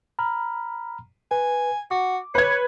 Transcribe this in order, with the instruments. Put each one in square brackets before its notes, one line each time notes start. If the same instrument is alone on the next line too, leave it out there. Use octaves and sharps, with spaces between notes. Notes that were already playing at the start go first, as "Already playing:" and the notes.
[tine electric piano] A#5 B5 F6
[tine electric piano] B4 [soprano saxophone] G#5
[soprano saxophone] F#4 [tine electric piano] D6
[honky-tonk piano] B4 G#6 [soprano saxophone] C#5